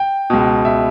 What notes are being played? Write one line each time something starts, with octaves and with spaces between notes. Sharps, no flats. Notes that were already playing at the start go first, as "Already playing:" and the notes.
Already playing: G5
C#2 B2
E5